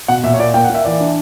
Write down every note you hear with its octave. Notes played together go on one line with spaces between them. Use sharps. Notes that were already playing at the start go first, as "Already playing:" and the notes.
B2 F#5
A#2 E5
C#5
A#3 D5
A#3 G5
F#5
A#3
E5
E3 D5
D4